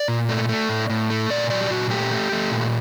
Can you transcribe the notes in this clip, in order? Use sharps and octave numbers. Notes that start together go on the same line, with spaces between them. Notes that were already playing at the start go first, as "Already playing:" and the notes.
Already playing: D5
A#2
A3
A3
A2
A2
A3
A#2 D5
F#3 D5
G4
A#2 F#4
A3 G4
A3
A3
A#2